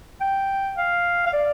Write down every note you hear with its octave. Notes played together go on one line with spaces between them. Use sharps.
G5
F5
F5
D5